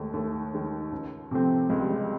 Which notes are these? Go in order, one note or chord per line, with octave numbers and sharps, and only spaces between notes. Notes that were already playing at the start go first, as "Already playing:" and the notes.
Already playing: D#2 D#3 G#3 A3
D#2 A3
D#3 G#3
C#2
C3 F3 A3 C4
C#2 G#3
G3
G#3